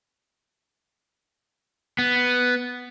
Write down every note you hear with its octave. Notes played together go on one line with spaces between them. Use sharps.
B3